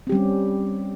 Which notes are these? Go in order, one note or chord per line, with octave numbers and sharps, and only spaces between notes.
G3 C4 C#4 G4